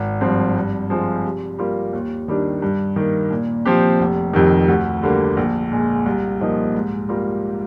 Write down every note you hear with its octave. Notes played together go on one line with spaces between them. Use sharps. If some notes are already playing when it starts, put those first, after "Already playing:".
Already playing: G#1
G2 F3 C4
G2
F3 G#3 C4 F4
C3
G3 A#3 F4
D#2
D#3 G3 D4
G2
D#3 A#3
A#2
F3 C4 G4
F1
F2 C3 D#3
D2
D3 G3 A#3
A#1
A#2 G#3
C2
A#2 F3 A#3 D#4
G#2
G3 A#3 F4 A#4